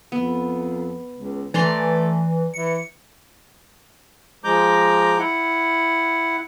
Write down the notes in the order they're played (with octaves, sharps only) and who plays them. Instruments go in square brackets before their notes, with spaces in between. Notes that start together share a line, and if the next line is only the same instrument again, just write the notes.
[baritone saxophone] F2 [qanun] B3
[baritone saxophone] C#2
[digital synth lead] E3 [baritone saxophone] A3 [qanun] D5 A#5 C6
[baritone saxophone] E3 [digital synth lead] C#7
[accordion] F3 G#3 A#5 D6 G6
E4 F#5